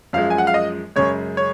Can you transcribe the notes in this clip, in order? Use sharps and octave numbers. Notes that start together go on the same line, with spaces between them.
F#2 F3 G#3 F5
G#5
F#5
F5
D#5
F#2 C#3 G#3 C#5
C#5